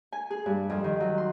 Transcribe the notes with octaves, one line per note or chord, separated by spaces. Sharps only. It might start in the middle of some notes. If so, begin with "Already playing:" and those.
G#5
G#4
G2
F2
D#3
F#3
C6